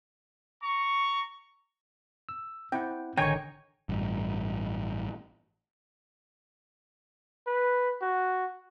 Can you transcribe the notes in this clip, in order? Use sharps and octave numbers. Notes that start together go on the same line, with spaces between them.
A#5 C#6
E6
C4 E4 F#5 G5
A1 D3 D#3 D#4 C#5 G5 G#5 C#6
A1 G2
B4
F#4